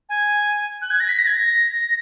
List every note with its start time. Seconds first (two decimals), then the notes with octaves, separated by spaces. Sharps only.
0.09 G#5
0.82 F#6
0.91 G#6
1.00 A#6
1.09 B6
1.19 A#6
1.27 G#6
1.35 A#6